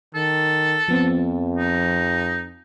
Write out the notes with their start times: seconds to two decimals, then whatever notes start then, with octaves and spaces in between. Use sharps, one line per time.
0.15 D#3 A4
0.88 F2 F3 B3 C4
1.58 D#4